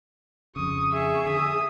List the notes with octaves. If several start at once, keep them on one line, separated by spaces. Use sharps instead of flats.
F2 C#3 C#6 D#6
G#4 E5 C#6
D3 D#6